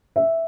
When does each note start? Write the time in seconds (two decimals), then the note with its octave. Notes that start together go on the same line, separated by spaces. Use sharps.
0.16 E5